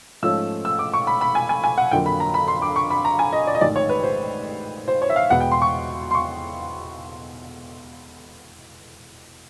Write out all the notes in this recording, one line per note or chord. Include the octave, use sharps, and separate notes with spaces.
G#2 F3 A3 C#4 E6
E6
D6
C#6
B5
B5
G#5
G#5
G#5
F#5
F2 D3 F#3 A#3 G5
B5
A#5
B5
C6
D6
C#6
B5
A#5
G#5
D#5
D5
D#5
A1 G#2 D#3 G#3 D5
C#5
B4
C5
C5
C#5
E5
F5
E2 B2 G#3 B3 F#5
G5
C6
C#6
C6
C#6